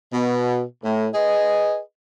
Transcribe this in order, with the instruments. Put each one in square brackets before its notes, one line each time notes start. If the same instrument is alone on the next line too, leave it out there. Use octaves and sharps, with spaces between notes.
[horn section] B2
A2
G#4 B4 D#5